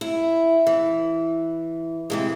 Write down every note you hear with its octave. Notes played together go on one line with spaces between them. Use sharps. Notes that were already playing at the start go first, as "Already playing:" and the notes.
E4
E3
C3 E3 G#3